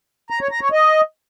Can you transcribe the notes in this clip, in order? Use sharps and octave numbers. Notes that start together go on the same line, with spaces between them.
A#5
C#5
A#5
C#5
D#5